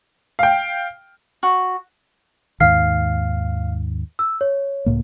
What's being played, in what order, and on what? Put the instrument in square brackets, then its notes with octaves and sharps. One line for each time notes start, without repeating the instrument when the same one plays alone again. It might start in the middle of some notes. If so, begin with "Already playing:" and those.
[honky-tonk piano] F5 G5
[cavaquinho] F#4
[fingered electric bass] D#2 G#2 D#3 [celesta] F5 F6 C7
[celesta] E6
C#5
[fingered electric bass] C#2 A2 A#3